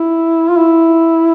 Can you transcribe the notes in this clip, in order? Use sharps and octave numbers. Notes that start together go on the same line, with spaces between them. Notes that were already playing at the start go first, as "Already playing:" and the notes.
Already playing: E4
F4
E4